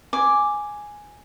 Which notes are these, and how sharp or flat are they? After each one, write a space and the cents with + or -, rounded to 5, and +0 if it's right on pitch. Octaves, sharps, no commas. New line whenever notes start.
G#5 +0 D6 +0